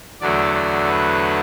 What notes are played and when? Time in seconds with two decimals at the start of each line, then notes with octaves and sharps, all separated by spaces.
0.21 E2 D3 F#3 A3 D5
0.54 D5
0.87 B4